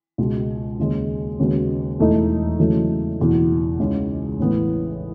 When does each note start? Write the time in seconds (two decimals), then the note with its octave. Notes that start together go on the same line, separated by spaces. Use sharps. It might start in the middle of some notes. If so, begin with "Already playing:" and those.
0.18 C#2 B2 G#3
0.79 D#2 C#3 G#3
1.39 D#2 C#3 G#3 B3 F#4
1.99 E1 E2 B2 A3 D#4
2.59 E2 C#3 F#3 A3
3.19 F#1 E2 B2
3.79 C#2 C#3 G#3 D#4
4.40 A1 A2 E3 B3